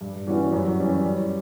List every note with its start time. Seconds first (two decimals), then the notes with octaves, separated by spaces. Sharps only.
0.01 G2
0.27 E3 G3 C#4 F#4
0.52 F#2
0.78 E3 G3 C#4
1.04 G3